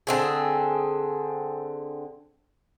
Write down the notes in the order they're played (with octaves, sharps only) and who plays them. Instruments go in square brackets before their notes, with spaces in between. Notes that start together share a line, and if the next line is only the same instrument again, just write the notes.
[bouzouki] D3 C4 G#4